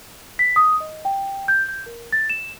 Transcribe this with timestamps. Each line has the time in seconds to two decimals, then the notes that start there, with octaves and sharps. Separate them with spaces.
0.39 B6
0.56 D#6
0.80 D#5
1.05 G5
1.48 G6
1.69 G6
1.86 A#4
2.13 A6
2.30 E7